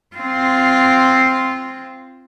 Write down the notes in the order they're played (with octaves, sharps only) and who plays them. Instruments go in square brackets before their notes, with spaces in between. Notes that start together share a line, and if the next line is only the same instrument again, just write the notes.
[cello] C4 F4